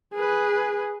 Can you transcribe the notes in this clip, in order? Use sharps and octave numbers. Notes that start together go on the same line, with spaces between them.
G#4 B4